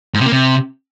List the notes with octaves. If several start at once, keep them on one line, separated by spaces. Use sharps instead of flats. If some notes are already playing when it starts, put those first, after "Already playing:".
G#2
C3
A#3
C3